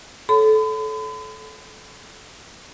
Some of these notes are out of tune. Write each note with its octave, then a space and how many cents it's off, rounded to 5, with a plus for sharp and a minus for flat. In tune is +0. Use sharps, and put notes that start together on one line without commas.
A4 -20 C#5 +0 B5 +40